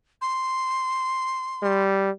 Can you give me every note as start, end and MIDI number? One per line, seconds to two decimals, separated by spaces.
0.21 1.83 84
1.63 2.11 55